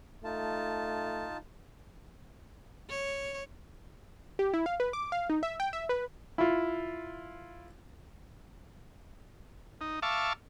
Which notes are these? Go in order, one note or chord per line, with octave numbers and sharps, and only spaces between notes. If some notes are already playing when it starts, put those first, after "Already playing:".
A3 D#4 F4 A5
C#5
G4
E4
F5
B4
D6
F5
D#4
E5
G5
E5
B4
E4 F4
D#4
E5 F5 A5 C#6 D6